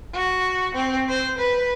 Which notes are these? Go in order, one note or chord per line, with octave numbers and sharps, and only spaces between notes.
F#4
C4
C5
B4